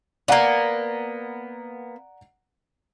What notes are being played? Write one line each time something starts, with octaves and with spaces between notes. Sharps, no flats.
A#3 B3 D5 F#5 A#5